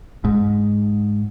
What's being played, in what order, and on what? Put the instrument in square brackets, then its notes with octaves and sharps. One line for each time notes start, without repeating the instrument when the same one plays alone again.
[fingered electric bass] G#2